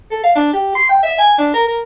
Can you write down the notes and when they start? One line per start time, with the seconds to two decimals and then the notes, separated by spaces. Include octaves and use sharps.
0.11 A4
0.24 F5
0.35 D4
0.53 G4
0.75 C6
0.89 G5
1.03 E5
1.18 G#5
1.38 D4
1.54 A#4
1.67 A#4